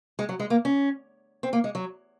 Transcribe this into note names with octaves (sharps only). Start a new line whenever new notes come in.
G#3
F#3
G#3
A#3
C#4
C4
A#3
G#3
F#3